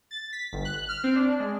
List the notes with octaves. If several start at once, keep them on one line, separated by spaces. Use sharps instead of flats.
A6
B6
G1
F#6
F6
C4
D4
G#3